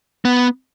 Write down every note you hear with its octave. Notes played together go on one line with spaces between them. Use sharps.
B3